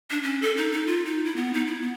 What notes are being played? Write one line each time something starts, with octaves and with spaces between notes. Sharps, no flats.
D4
C#4
A4
D#4
D#4
F4
D#4
E4
B3
D#4
E4
B3